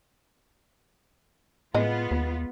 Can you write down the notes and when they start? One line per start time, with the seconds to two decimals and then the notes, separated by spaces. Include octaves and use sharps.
1.74 A2 G#3 B3 F4 D#5
2.11 D#2